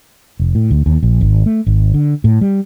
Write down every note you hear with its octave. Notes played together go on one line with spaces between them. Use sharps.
F1
A2
D2
D#2
A#1
G#1
A3
G#1
D3
A2
G3